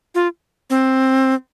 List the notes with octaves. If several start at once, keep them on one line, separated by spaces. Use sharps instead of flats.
F4
C4